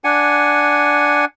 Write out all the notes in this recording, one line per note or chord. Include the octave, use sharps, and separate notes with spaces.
D4 F#5 G#5